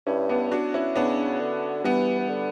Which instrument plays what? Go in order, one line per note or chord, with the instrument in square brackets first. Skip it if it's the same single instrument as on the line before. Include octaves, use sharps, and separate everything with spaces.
[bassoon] G2 [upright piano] C#4 E4
[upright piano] B3 D4
D4 F#4
C#4 E4
[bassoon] C#3 [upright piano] B3 D4
[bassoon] D3
[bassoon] E3 [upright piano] G3 B3
[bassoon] E3
D3